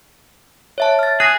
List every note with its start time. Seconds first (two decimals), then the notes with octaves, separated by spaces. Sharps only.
0.78 C#5 E5 A5
0.99 F6 A6
1.20 G#4 F#6 A#6